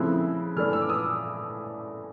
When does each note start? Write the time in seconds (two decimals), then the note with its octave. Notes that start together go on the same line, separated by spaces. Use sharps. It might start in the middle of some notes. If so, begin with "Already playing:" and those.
Already playing: C#3 F3 A3 C4 E4 F#6
0.57 E3 A3 D4 F6
0.73 E6
0.82 D6
0.89 D#6